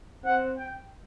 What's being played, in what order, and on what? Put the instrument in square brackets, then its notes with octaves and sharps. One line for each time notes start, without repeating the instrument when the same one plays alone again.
[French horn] C4 [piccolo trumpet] F#5
[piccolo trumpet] G5